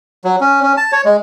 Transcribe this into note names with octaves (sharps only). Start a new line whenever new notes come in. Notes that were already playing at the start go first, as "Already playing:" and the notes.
F#3
C#4
C#4
A5
C#5
G#3